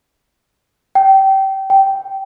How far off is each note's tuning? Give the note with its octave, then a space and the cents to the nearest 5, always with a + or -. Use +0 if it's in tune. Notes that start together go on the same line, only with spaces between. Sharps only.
G5 -25
G5 -10